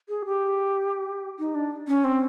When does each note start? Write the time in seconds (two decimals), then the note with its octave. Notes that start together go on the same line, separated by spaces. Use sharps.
0.09 G#4
0.26 G4
1.39 D#4
1.55 D4
1.88 C#4
2.04 C4